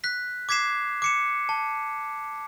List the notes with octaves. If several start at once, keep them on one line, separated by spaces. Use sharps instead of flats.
F#6 B6
D6 G#6 B6 C7 E7
D6 C#7 E7
A5